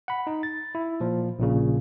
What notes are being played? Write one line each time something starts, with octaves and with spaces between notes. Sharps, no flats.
F#5 B5
D#4
A6
E4
A#2 F3
A#1 A#2 C#3